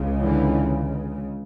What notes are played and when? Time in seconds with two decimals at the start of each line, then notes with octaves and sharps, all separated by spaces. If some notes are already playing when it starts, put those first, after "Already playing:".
Already playing: C#2 C#3
0.21 D3 E3